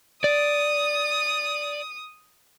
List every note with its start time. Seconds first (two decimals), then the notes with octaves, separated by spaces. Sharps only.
0.24 D5 D#6